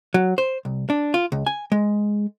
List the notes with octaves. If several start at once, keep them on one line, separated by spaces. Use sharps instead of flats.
F#3
C5
C2
D4
F4
C#2
G#5
G#3